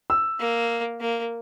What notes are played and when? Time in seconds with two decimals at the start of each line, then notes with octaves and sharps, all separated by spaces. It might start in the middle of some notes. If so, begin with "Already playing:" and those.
0.10 E6
0.39 A#3
1.00 A#3